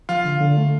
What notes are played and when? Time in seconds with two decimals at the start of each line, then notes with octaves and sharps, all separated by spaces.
0.09 F3 F4
0.25 D3
0.41 D3
0.57 A3